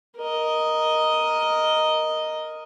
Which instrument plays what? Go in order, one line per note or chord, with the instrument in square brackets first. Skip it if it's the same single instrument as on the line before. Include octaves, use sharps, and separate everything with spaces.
[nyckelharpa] A#4 D#5